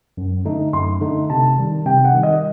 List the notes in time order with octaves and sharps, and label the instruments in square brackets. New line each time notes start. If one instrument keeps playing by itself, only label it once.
[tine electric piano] F#2
D3 A3 D#4
[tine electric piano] F#2 [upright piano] C6
[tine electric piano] D3 A3 D#4
[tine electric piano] C3 [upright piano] A5
[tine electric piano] D#3 G3
[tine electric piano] C3 [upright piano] G5
[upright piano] F#5
[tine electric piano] D#3 G3
[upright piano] D#5